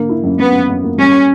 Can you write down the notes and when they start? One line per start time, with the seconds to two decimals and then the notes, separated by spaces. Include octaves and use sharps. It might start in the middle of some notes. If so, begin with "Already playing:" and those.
Already playing: D3 A#3
0.09 E4
0.24 F#2
0.39 F#2 B3
0.53 F#2
0.69 F#2
0.84 A#3
0.98 G3 C#4